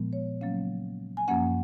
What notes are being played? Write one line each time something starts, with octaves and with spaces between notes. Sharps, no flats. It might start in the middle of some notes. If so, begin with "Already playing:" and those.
Already playing: A#2 F3 G#3 B3
C#5
C#3 F#3 A#3 C#4 F5
G#5
F#2 F3 A#3 C#4 F#5